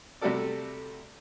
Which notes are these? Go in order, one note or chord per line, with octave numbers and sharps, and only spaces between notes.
C3 G3 A3 F#4 A4 D5